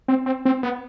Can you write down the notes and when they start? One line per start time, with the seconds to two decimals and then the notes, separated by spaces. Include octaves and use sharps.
0.08 C4
0.26 C4
0.45 C4
0.63 B3